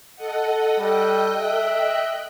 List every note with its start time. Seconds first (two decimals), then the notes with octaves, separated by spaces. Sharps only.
0.16 A4 D#5 F#5
0.79 G3 A4 D#5 G5 F#6
1.40 E5